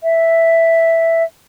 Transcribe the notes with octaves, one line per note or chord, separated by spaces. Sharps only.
E5